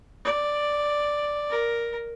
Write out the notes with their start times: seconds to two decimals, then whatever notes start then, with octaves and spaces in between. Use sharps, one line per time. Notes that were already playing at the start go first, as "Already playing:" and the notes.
0.25 D5
1.50 A#4